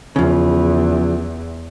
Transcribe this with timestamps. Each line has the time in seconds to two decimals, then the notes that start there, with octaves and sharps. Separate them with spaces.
0.16 E2 C#3 F3